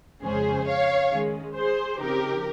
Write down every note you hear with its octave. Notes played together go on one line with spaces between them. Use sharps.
F2 C#3 G#3 C#4 G#4 C5
C#5 F5
D#3 G#3 C#4
G#4 C5
C#3 F3 C4 D#4 G4 A#4